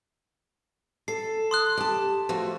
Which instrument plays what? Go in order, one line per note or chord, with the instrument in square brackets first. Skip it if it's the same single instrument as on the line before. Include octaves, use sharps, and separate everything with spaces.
[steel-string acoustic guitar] A4 [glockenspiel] C7
[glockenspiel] C6 D#6 F#6
[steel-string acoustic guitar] G4 A5
F3 A3 F#4